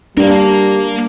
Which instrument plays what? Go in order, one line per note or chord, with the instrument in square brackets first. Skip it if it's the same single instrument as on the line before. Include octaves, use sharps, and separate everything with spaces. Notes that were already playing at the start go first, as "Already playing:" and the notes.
[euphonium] G3 [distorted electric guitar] A#3 A#4 [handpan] D4